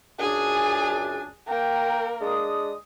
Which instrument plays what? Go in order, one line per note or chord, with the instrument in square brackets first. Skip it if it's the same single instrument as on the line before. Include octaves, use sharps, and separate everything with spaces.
[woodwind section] C#2 F#2 D4 [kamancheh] G#4 G#5
[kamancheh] A#3 A#4 [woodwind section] G5
[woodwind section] G#3 D4 D#6